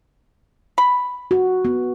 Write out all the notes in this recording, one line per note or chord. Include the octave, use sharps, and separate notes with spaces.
B5
F#4
B3